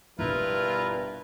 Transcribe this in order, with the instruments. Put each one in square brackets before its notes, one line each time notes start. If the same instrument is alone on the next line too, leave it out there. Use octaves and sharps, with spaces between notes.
[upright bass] G1 B2 [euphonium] G2 [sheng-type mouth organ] E4 A#4 B4 [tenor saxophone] F4